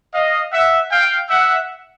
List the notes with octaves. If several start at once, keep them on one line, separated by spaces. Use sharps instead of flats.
D#5 F5
E5 F#5
F5 G5
E5 F#5